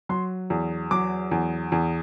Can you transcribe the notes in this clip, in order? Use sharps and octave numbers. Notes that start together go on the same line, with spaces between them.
F#3 C6
E2
F#3 D6
E2
E2